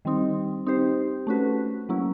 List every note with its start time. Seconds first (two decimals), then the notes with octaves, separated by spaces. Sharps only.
0.05 D#3 G3 C4 D#4
0.66 C4 D#4 G4 C5
1.27 A3 C#4 F#4 B4
1.89 F#3 A#3 C#4 E4